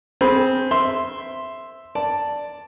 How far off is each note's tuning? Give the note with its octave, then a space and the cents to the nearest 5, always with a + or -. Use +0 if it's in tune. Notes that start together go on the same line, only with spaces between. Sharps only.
C4 +0 G#4 +15 B5 -5
E5 +0 C6 +0
D5 +0 A5 +0